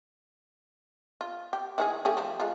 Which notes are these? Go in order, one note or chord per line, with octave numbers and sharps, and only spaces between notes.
F4
G4
D#3 E3 G#4
A3 G4 G#4
F3
G#3 F4